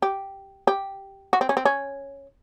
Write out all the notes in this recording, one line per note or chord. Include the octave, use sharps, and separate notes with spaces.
G4
G4
F#4
C4
C#4
C4
C#4